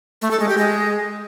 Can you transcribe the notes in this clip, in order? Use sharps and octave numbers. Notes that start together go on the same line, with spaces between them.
A3
A4
G#3
G4
G#3